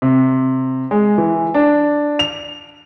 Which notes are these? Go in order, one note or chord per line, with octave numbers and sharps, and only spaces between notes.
C3
G#3
E3
D4
F7